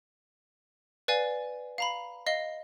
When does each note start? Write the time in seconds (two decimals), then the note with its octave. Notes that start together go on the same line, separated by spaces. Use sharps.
1.08 B4 D5 F5 G#5
1.78 F5 A#5 B5
2.27 D#5 F5 G7